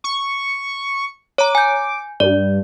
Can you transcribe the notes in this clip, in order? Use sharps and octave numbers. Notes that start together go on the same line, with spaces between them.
C#6
C#5 A#5 D6
G#5 G6
G2 D5